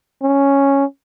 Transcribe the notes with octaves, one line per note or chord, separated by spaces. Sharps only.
C#4